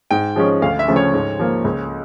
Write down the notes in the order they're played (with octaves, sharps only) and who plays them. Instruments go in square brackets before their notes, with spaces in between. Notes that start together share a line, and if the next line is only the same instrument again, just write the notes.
[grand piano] G#2 [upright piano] G5
[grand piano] F3 G#3 C#4
[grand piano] D2 [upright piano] F5
[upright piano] E5
[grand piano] C#3 F3 A3
[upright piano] C#5
[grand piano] G#2
F3 A#3
C#2